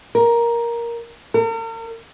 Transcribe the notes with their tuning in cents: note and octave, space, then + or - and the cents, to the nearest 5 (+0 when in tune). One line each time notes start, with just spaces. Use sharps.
A#4 +10
A#4 -40